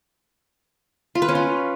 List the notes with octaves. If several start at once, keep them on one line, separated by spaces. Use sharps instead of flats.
F4
B4
C#4
F4